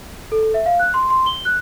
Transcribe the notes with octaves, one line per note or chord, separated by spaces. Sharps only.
A4
E5
F5
F#6
C6
C6
G7
F#6